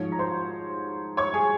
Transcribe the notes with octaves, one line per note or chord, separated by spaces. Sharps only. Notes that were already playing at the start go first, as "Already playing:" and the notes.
Already playing: G#2 F3 C#5
A#5
C5 C6
C#5 C#6
G#4 G#5